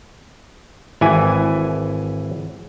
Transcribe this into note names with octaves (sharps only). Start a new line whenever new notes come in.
G#1 E3 E4 G#5